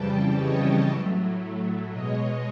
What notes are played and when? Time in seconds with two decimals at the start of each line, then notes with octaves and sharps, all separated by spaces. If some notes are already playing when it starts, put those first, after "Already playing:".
Already playing: F2 C#3 E3 G3 G5 A5
0.34 C#5 D#5
0.87 A2 F#3 A3
1.91 B2 G#3 C#5 D#5